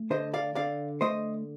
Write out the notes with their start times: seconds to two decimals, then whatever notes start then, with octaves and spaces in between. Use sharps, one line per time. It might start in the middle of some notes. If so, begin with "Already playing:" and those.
Already playing: A3
0.10 D3 C5 D#5
0.34 D5 F5
0.55 D3 D5 F5
1.01 A3 C5 D#5